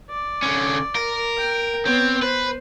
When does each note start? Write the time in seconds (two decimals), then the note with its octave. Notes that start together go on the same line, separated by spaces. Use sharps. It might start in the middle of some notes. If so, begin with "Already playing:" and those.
0.10 D5
0.43 D3 C#4
0.95 A#4
1.37 G5
1.86 B3 C4 C#5
2.22 B4 C5